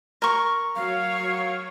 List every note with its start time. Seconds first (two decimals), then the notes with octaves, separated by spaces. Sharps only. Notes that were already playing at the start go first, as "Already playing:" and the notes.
0.22 A#4 C#6
0.76 F#3 C#5 F5